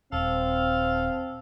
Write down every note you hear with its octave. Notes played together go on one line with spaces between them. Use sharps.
D#1 C4 A4 F5